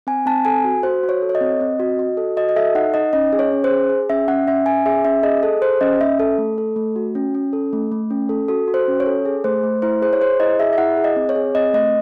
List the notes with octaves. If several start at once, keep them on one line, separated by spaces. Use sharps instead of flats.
C4 G#5
C4 A5
A4 G#5
F#4
F#4 C5
F#4
C#5
A4
C#5
D#5
C4
C4
F#4
F#4
A4
F#4 D#5
D#5
A4 E5
D#4 F#5
D#4 D#5
C#4 D#5
G#4
C#5
C#4
C5
G#4
G#4
C#4 E5
C#4 F#5
C#4 E5
C#4 G#5
G#4 E5
C#4 E5
G#4 D#5
G#4 A4
G#4 C5
C#4 D#5
C#4 E5
A4
A3
A4
A3
F#4
C#4
C#4
A4
A3
A3
C#4
A4
F#4 A4
F#4
C5
C#4
C#5
A4
G#4
A3 C5
A3
E4 C5
G#4 C5
C#5
G#4 C5
E4 D#5
G#4 E5
E5
E4 F#5
G#4
D#5
C4
C#5
G#4
C4 D#5
A3 D#5